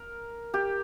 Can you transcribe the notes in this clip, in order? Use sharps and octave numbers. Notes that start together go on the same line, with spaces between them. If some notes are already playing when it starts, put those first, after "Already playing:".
Already playing: A#4
G4